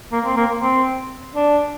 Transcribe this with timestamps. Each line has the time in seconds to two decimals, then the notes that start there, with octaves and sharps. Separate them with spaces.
0.12 A#3
0.25 C4
0.37 A#3
0.61 C4
1.35 D4